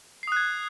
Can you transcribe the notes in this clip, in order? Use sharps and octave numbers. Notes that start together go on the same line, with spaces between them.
D#6 F#6 G#6 C7